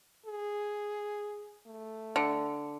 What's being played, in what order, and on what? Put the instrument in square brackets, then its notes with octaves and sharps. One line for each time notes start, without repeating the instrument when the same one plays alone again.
[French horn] G#4
A3
[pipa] D3